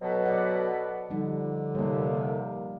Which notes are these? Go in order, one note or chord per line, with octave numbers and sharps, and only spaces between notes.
B2 F#3 A4 B4
D5 F#5
D3 F3 G3 D#4
D#2 C3 G3 A#3